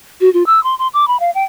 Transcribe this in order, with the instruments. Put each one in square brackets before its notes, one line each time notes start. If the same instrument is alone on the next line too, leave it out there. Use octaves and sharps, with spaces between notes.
[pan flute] F#4
F4
E6
C6
C6
D6
B5
F5
G5